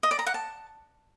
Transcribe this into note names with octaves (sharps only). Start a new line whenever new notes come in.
D#5
D5
A#5
F#5
A5